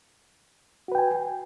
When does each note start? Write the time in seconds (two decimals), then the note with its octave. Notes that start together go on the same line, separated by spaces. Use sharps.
0.88 F#4
0.92 B4
0.95 G5
0.98 G#5